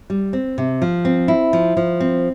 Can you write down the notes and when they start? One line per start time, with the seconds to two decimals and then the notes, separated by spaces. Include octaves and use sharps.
0.10 G3
0.33 C4
0.58 C3
0.82 F3
1.05 C4
1.28 E4
1.53 F3
1.77 F3
2.00 C4